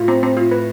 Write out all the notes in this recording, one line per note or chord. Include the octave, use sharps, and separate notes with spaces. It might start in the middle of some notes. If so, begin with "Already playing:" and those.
Already playing: A2 F4
C4
C4
F4
B4